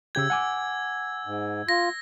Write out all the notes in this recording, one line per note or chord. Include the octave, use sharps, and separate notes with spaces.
C#3 G4 E6 G6 G#6
F#5 G#5 D6
G#2
F4 A#6